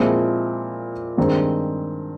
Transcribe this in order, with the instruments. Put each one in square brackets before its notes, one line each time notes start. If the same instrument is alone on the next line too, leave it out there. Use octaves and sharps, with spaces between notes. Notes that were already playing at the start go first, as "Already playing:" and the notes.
Already playing: [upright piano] A#2 F3 G#3 C4 E4
G2 D#3 G#3 C4